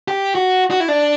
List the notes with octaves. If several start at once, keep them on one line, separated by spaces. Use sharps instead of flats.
G4
F#4
F#4
E4
D4